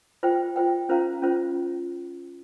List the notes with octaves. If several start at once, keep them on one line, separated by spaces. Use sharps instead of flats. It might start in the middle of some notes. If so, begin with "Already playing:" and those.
F4 C5 G5
F4 C5 G5
C#4 F4 C5 F5 A#5
C#4 F4 C5